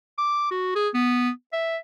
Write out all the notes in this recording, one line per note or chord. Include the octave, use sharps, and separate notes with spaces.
D6
F#4
G#4
B3
E5